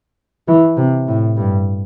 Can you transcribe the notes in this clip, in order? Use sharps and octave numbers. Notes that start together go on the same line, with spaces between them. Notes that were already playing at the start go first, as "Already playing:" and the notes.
E3
C3
A2
G2